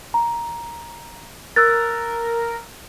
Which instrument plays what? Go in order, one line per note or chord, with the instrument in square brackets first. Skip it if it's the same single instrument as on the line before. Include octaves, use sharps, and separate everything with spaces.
[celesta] A#5
[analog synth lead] A#4 [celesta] E6 F#6 A6